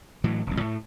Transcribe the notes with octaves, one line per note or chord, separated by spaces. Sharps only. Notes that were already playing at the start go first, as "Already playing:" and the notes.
A2 E3 F#3
F1 C2
A2 A3